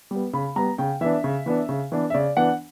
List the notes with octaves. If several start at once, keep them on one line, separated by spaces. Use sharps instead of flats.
G3 B3
C#3 B5
G3 B3 A#5
C#3 G5
E3 B3 D4 E5
C#3
E3 B3 D4
C#3
E3 B3 D4
E5
C#3 D5
E3 B3 D4 F#5